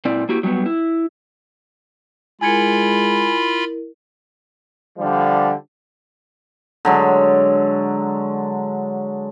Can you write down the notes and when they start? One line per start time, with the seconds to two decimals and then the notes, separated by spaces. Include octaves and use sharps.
0.05 A#2 C4 E4 D5
0.29 A#3 E4 F#4 G4
0.43 F#3 G3 A#3 B3
0.66 E4
2.41 G#3 E4 F4 A#4 G#5 B5 G#6 C#7
4.98 D3 F3 G3
6.85 D3 F#3 G#3